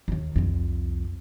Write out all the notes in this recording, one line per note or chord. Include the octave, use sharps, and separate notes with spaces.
D#2 D#3
C2 F2